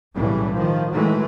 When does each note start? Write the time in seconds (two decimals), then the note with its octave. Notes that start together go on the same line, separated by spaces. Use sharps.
0.14 B1 A2 C#3 E3 G3
0.55 D#3 F3
0.92 D#3 E3 F#3 G#3 A3